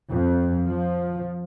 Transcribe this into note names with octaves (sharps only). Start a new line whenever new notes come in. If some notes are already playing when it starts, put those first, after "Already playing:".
F2
F3